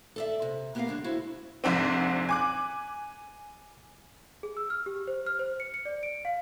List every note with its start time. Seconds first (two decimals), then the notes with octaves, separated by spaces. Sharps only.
0.16 A4 D5 E5
0.42 C3
0.75 A#3 B3 G4 G#4 A#4 F5
0.87 F#2 D3 G#3 D4
1.04 E4 F#4 A4 C5 F5
1.64 F1 A#1 G#2 C4
2.29 G#5 D6 F#6
4.43 G#4
4.57 E6
4.70 F6
4.86 G4
5.07 C5
5.26 F6
5.39 C5
5.60 C#7
5.74 C#7
5.85 D5
6.03 D7
6.25 F5